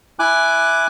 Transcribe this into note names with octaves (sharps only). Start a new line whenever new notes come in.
E4 G#5 D6 F#6